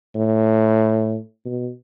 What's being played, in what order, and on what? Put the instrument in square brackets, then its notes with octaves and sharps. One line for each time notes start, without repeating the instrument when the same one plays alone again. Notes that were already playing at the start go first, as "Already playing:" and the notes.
[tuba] A2
B2